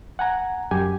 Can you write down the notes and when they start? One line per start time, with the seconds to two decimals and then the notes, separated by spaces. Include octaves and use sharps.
0.19 F#5 G#5 A#5
0.71 F#2 G4 G#5